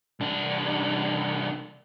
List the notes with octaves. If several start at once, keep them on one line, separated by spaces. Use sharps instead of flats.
C2 D4